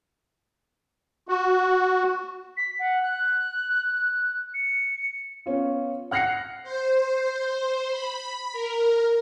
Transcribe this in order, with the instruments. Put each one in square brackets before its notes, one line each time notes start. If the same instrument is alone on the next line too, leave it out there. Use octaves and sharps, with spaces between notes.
[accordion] F#4
[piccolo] B6
F#5
F#6
C#7
[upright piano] B3 C#4 F4
F#5 F6 F#6 A#6 C7 C#7
[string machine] C5
B5
A#4